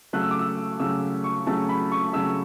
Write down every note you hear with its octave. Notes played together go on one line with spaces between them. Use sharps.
C#3 F#3 A3 F#6
E6
D6
E6
C#3 F#3 A3 E6
C#6
C#3 F#3 A3 A5
B5
C#6
C#3 F#3 A3 E6